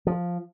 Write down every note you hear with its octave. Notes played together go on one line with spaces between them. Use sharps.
F3